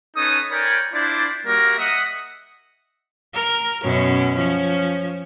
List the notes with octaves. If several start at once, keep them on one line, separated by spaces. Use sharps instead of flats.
C#4 D#4 A4 B4 C#5 D#6
A#4 C#5 D5 G5 G#5 B5
D4 E4 F4 C5 D5
G3 A#3 F#4 A#4
D#5 E5 F#5 D#6
A#4
F#2 B2 C#4
F3 C#4